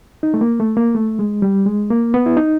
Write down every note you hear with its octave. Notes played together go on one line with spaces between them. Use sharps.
D#4
A3
A#3
A3
A#3
A3
G#3
G3
G#3
A#3
B3
E4
D#4